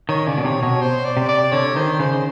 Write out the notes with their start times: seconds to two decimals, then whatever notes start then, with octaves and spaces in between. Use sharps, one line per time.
0.09 D#3 C#5
0.27 C#3 D5
0.38 B2
0.44 C3 C#5
0.62 B2 C#5
0.81 C5
1.05 D5
1.17 C3
1.28 D5
1.52 D3 C#5
1.76 D#3 C5
1.99 C#3 C5